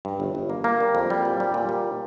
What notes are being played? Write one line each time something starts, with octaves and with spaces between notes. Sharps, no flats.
G2
G1
G1
A#3
A#3
G3
F2
G3
A#2
G3
A#2
G3